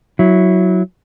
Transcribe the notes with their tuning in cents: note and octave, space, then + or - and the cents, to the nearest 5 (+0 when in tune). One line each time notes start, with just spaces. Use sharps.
F#3 +0 E4 +0